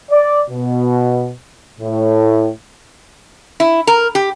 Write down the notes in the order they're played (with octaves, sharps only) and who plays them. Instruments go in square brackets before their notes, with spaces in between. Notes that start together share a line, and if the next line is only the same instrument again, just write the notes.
[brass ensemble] D5
B2
A2
[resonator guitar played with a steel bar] E4
A#4
G4